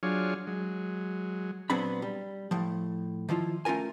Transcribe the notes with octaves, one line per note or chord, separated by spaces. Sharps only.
F#3 D4 F4 G#4 C#5
F#3 G#3
A#2 F#3 B3 C4 D4 B5
G3
A2 F3
D#3 F3 E4 F4
A3 C#4 F4 A#4 G#5